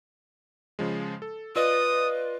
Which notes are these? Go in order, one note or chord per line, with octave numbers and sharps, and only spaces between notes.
C#3 F3 G#3
A4
F4 B4 D5 D#5 D#6